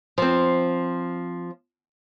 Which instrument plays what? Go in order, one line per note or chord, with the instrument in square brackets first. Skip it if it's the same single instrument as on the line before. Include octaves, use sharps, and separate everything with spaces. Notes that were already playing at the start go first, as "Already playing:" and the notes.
[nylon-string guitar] F3 C4